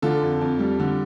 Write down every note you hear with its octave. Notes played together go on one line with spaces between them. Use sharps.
D3 F4 A4
F2
F2
G3
D3